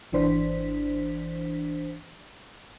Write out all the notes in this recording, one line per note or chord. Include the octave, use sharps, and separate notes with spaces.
G#1 E3 D4 C5 B6